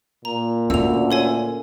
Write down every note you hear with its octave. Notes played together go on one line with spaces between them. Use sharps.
A#2 A#5
D2 C#4 F4 E6 F7
A4 C#5 G#5